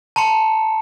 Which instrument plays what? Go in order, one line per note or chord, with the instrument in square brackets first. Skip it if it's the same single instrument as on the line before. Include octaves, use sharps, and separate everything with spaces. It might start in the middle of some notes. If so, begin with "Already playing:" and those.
[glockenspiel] A5 A#5 C6 C#7